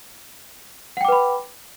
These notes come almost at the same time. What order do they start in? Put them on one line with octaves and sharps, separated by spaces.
F#5 G5 D6 B4 B5